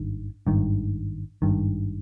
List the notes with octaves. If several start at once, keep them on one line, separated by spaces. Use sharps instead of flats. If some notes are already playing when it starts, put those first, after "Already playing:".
Already playing: G#1 G2 D#3
G#1 G2 D#3
G#1 G2 D#3